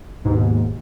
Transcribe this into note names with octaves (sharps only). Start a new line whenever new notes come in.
D#2 G#2 B2